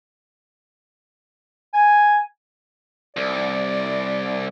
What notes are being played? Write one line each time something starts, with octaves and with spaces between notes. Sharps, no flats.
G#5
C2 D5